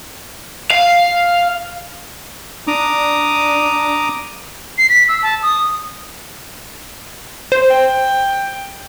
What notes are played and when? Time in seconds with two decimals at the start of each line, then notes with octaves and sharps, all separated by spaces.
0.70 F5
2.67 D4 A#5 D6 D#6
4.78 C7
4.89 B6
5.08 E6
5.23 A5
5.42 D#6
7.52 C5
7.70 G5